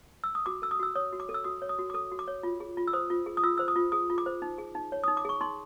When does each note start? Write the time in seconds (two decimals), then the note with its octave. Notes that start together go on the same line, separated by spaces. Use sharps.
0.24 E6
0.35 D#6
0.46 F#4 D6
0.62 A4 E6
0.71 D#6
0.79 F#4 E6
0.95 C#5 D#6
1.13 F#4
1.20 D6
1.29 A4
1.34 E6
1.44 F#4 D#6
1.62 C#5
1.69 D#6
1.79 F#4
1.90 D6
1.94 A4 D#6
2.12 F#4
2.19 D6
2.28 C#5
2.43 F4
2.60 G#4
2.77 F4
2.87 E6
2.93 C5 D#6
3.10 F4
3.26 G#4
3.37 D#6
3.43 F4 E6
3.58 C5 E6
3.68 D#6
3.76 F4
3.92 G#4 D#6
4.10 F4
4.18 D6
4.26 C5
4.42 D#4
4.58 G#4
4.75 D#4
4.92 C#5
5.04 D#4 D#6
5.17 D6
5.25 G#4 C#6
5.41 D#4 C6